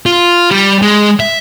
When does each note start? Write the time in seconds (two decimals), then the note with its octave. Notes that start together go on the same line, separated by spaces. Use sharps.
0.06 F4
0.51 G3
0.82 G#3
1.20 E5